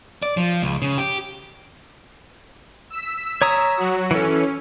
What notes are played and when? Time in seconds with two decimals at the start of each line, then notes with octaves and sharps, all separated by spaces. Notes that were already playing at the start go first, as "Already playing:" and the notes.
0.23 D5
0.37 F3
0.62 C#2
0.82 C#3
0.98 G4
2.90 E6 B6
3.42 C#5 A#5 D#6
3.77 F#3 F#4
4.11 E3 C#4 A4